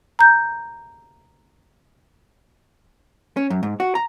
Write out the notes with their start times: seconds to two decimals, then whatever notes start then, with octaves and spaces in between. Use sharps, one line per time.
0.19 A#5 G6
3.37 C#4
3.50 F#2
3.63 G#2
3.80 F#4
3.95 A#5